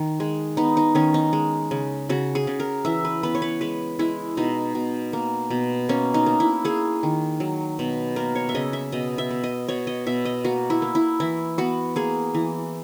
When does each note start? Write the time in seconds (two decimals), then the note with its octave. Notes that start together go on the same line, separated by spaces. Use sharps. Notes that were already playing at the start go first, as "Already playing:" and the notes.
Already playing: D#3
0.20 G#3
0.57 B3 D#4
0.77 D#4
0.95 D#3 C#4
1.14 D#4
1.33 G#3
1.71 C#3
2.09 C#3 F#4
2.35 G#4
2.47 C#3
2.60 A#4
2.85 E3 E5
3.05 B4
3.23 B3 B4
3.35 C#5
3.42 B4
3.61 G#3 B4
3.99 G#3 E4
4.37 B2 D#4
4.75 B2
5.13 A#3
5.50 B2
5.89 A#3 C#4
6.14 D#4
6.26 A#3
6.40 E4
6.65 A#3 G#4
7.03 D#3
7.40 F#3
7.79 B2
8.16 A#3 A#4
8.35 C#5
8.49 E5
8.55 C#3 D#5
8.73 E5
8.92 B2 D#5
9.18 E5
9.31 B3
9.44 D#5
9.68 B2 C#5
9.87 D#5
10.07 B2 E5
10.25 D#5
10.44 A#3 F#4
10.70 E4
10.82 A#3
10.95 E4
11.20 E3 E4
11.58 B3 F#4
11.96 A#3 G#4
12.34 E3